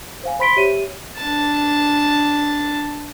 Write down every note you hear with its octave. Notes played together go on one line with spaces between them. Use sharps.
C5 F5 G#5
C5 B5 C6 B6 D7 G7
G4 C#5 E5 D#7
D4 A5